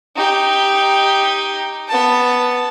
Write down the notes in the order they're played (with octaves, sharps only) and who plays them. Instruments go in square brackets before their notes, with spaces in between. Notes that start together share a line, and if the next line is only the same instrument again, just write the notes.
[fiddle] D#4 G4
B3 A5